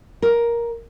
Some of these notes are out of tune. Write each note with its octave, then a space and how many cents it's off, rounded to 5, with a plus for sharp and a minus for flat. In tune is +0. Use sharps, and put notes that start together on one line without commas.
A#4 +10